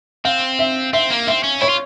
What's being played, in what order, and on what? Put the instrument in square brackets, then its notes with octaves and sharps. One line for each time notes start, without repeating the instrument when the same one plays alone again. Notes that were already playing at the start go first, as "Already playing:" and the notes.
[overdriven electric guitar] C4 [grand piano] F5
[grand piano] E5
[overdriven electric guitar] C4 [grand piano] E5
[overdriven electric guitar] A#3
[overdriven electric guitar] C4 [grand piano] E5
[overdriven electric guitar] C#4
[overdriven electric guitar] E4 [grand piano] C#5
[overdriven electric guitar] F4